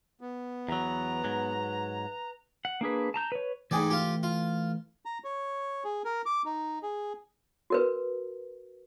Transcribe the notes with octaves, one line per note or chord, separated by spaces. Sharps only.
B3
E2 F#3 B4 A#5
G#2 F#3
F#5
A#3 D4 G#4 B4
A5 A#5 G6
B4 C#5
G#2 E3 A3 G#4 D5 G5
F4 G4
F4
A#5
C#5
G#4
A#4
D6
D#4
G#4
F#4 A#4 B4